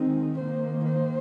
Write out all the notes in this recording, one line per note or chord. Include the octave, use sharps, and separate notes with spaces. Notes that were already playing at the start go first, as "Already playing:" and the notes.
Already playing: D#3 G#3 C4 D#4
D#3 A#3 C5
C5